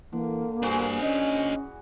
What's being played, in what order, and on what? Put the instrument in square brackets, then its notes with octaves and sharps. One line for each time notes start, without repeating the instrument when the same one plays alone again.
[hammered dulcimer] D3 [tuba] E3 [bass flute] A#3
[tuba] G2 [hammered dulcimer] E3 F#4 G#4 [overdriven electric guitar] D4 C5
[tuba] C#4 [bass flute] D#5